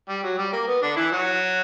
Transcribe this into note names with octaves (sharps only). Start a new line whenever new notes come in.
G3
F#3
G3
A#3
B3
D3 D4
E3 E4
F#3 F#4